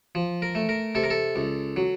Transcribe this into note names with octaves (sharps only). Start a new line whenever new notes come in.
F3
A#4
A3
A#4
C3 A4
A#4
A4
C#2
F#3